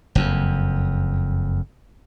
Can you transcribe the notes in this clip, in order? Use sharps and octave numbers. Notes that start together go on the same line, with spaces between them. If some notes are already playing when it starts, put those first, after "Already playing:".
F#1 F2